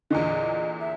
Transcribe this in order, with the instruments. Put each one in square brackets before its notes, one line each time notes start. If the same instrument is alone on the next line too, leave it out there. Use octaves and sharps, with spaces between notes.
[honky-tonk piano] E2 A#2 D3 [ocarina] D#5
[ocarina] E5